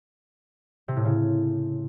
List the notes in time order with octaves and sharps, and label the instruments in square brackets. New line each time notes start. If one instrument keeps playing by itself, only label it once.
[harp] C3
A2
C#3